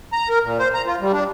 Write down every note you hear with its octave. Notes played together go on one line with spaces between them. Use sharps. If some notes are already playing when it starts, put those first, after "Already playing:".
A#5
A#4
A#2
C5
A#5
F4
G3
D4